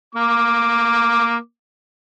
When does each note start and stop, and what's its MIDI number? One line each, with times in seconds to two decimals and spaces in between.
0.15 1.36 58
0.15 1.36 86